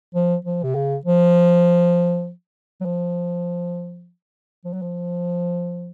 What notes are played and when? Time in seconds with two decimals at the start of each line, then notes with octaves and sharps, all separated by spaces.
0.15 F3
0.45 F3
0.64 C3
0.75 C#3
1.05 F3
2.81 F#3
2.85 F3
4.65 F3
4.73 F#3
4.82 F3